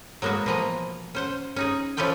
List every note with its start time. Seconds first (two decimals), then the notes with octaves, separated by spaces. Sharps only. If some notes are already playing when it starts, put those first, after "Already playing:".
0.22 F#3 G#3 A#3 B3 F#4
0.46 B2 E3 F3 A#3 D#5 A#5
1.15 C#4 C5 F#5
1.56 C#4 D#4 G#4
1.97 F3 C#4 E4 F4 D5 G5